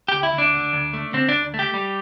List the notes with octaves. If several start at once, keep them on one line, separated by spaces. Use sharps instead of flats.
D2 G4
E4
D2
D4
D3
D2
A3
D3 C4
D2 D4
A3
G4
G3